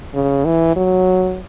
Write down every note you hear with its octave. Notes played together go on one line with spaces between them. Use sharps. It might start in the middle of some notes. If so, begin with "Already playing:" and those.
C#3
E3
F#3